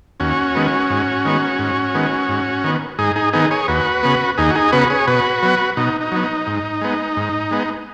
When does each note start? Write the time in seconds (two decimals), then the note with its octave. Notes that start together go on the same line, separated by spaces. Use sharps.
0.20 D#2 C#4 F#4
0.55 D#3 G#3 B3
0.90 G#2
1.25 D#3 G#3 B3
1.59 G#2
1.94 D#3 G#3 B3
2.29 G#2
2.64 D#3 B3
2.99 G#2 D#4 G#4
3.16 D#4 G#4
3.33 D#3 B3 D#4 G#4
3.51 G#4 C#5
3.68 D#2 F#4 B4
4.03 C#3 B3
4.38 D#2 D#4 G#4
4.51 F#4
4.55 D#4 G#4
4.72 C#3 B3 F#4 B4
4.90 G#4 C#5
5.07 B2 F#4 B4
5.43 F#3 B3
5.77 B2 D#4
6.01 D#4
6.12 F#3 B3
6.24 D#4
6.47 G#2
6.81 G#3 B3
7.17 G#2
7.51 G#3 B3